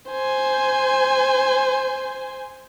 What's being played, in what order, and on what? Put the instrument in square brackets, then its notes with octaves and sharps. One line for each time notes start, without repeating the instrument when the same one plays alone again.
[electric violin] C5 G#5